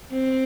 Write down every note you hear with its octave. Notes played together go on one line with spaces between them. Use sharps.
C4